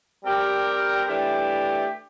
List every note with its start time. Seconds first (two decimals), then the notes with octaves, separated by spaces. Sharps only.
0.24 G3 C4 G4 A#4
1.06 E3 A3 D4 G4